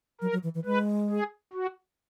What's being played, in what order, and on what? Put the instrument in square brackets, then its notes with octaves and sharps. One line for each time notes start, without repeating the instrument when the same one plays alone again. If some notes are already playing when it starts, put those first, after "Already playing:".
[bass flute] F#3 [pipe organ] A#4
[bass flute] F#3
E3
E3
[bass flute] G#3 [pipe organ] B4
[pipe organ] G#4
F#4